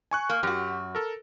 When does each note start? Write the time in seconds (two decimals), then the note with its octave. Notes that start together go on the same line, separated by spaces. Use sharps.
0.11 G#5 C#6 F#6
0.29 A#3
0.43 F#2 F#4 G4
0.95 A4 A#4